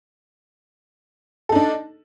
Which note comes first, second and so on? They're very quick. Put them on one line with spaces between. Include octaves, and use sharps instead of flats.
A4 D#4 D4